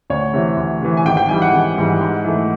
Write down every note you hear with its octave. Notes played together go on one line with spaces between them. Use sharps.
D2 C#5
C3 E3
D2
C3 E3
G#5
G#1 G5
G5
G#2 E3 G3 G#5
F#5
G#1
G#2 E3 G3
G#2
E3 A3